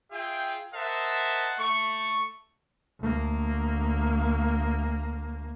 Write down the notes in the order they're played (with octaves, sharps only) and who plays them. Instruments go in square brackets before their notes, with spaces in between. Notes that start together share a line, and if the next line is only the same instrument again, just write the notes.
[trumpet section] F4 G#4 E5 G5
A#4 C5 D#5 E5 F#5 A5
A3 C#6
[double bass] D2 A#3